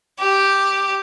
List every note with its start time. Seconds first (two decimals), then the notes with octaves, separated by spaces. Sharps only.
0.20 G4